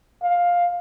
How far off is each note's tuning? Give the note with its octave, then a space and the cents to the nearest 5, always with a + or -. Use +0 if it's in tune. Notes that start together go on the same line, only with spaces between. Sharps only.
F5 +10